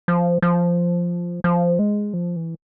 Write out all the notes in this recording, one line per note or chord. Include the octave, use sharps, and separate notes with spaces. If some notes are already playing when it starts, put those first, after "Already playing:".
F3
F3
F3
G#3
F3
E3